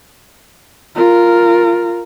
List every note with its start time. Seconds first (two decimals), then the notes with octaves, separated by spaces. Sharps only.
0.95 F4 A#4